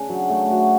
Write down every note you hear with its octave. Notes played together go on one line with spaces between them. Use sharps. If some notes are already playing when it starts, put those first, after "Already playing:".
Already playing: C#3 D4
F#3
A3
F#4